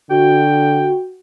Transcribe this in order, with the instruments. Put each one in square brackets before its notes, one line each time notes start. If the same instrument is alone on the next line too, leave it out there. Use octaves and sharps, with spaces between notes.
[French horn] D3 [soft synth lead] F#4 [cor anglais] G5